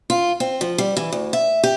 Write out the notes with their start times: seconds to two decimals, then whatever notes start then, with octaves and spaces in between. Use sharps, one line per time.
0.10 F4
0.40 C4
0.61 F3
0.78 G3
0.97 E3
1.12 D2
1.33 E5
1.63 G4